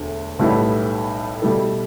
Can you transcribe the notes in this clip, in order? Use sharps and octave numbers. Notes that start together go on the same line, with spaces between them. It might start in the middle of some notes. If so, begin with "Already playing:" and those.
Already playing: E1 D2 D3
B1 A2 G3 B3 E4
B2 G3 E4 A4